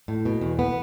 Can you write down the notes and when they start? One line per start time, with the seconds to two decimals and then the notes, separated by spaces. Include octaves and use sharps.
0.08 A2
0.25 B2
0.41 E2
0.59 B3